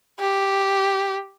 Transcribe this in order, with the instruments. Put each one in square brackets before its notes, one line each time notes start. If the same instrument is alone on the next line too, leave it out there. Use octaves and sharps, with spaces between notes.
[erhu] G4